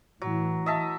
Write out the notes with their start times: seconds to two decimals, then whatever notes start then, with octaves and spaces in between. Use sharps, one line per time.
0.22 A2 E3 F#3
0.66 D#5 E5 A5